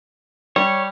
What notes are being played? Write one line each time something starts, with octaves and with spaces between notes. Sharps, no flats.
G3 C#5